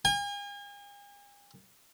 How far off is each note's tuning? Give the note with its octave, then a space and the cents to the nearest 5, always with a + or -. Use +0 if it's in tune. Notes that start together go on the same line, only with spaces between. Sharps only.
G#5 -40